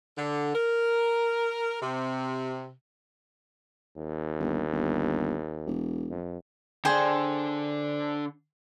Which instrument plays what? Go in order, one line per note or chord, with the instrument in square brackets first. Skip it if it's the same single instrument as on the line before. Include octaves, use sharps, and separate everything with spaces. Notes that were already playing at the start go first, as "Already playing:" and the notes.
[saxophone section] D3
A#4
C3
[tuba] D#2
[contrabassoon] G1
G1
E1
[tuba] F2
[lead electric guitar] D3 D4 [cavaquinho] G#4 C5 G5